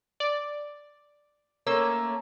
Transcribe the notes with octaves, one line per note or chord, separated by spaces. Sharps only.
D5
A3 A#3 C#4 E6